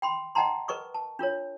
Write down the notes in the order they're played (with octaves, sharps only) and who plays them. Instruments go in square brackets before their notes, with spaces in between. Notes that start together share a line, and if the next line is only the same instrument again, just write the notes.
[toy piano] G5 B5 C6
D#5 F#5 G5 A5 A#5 C6
A#4 B4 D#5 C#6 D#6
A5
D4 F4 A#4 C#5